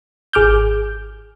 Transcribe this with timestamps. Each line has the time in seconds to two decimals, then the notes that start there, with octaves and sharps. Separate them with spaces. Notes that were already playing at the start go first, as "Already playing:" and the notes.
0.33 G#1 G#4 D6 F6 G6